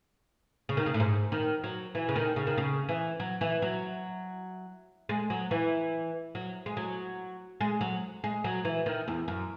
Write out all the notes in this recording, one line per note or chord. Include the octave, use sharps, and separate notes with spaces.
C#3
D#3
C#3
A2
G#2
D#3
F#3
E3
C#3
D#3
C#3
D#3
C#3
E3
F#3
E3
F#3
G#3
F#3
E3
F#3
G#3
F#3
G#3
F#3
G#3
F#3
E3
D#3
E2
F#2